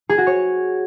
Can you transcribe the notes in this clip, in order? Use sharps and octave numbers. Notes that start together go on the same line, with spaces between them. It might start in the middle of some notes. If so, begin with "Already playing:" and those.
G#4
F#4
C#5